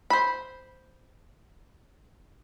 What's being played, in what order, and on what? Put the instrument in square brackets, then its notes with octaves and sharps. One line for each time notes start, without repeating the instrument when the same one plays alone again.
[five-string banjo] C5 B5